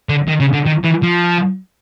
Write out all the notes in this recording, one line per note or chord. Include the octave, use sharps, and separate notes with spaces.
D3
D#3
C#3
D3
D#3
E3
F3